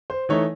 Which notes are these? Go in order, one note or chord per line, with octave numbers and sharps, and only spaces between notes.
C5
E3 A3 D#4 C#5